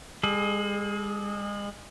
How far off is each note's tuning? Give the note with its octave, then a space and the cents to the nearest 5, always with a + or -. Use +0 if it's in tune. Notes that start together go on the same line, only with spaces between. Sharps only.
G#3 -35 G#4 +40